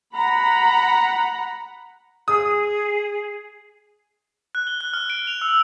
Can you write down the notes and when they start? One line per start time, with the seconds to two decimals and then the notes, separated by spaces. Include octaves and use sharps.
0.14 F#5 A#5 B5
2.28 G#4 D#6
4.55 F#6
4.67 G7
4.81 F#6
4.93 F6
5.10 D7
5.27 F7
5.41 E6